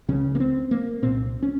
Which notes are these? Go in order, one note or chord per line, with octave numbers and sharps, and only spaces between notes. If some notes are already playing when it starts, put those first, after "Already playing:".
C#2 C#3 C#4
A#3
C4
A#3
C2 A#2 C4
C#4